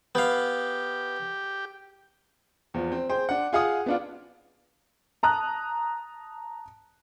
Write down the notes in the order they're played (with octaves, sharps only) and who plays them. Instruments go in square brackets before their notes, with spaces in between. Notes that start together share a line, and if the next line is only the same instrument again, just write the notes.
[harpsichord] B3 F5 [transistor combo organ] G4
[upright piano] E2 F3
C4
G#4 C5 G5
D4 F#5
F4 G#4 F5 F#5 D#6
B3 D4 F4
A5 A#5 D#6 F#6